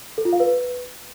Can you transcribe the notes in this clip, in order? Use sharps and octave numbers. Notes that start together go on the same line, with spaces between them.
A4
F4
F5
B4